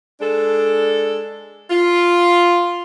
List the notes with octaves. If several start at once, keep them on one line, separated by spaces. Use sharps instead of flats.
G#3 D4 A4
F4